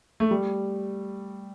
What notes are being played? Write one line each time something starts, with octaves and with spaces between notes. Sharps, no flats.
A3
G3